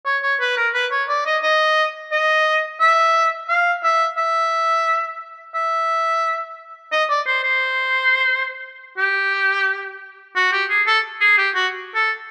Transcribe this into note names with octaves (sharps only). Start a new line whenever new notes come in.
C#5
C#5
B4
A#4
B4
C#5
D5
D#5
D#5
D#5
E5
F5
E5
E5
E5
D#5
D5
C5
C5
G4
F#4
G4
G#4
A4
G#4
G4
F#4
A4